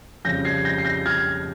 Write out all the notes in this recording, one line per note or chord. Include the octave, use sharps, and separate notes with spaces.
F2 C#3 G3 G6 A#6
G#6 C7
G6 A#6
C7
G6 A#6
F6 G#6